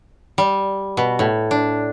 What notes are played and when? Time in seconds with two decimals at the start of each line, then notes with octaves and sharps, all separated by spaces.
0.38 G3
0.97 B2
1.19 A2
1.51 D4